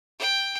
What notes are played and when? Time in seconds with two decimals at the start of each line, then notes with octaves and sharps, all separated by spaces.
0.19 G5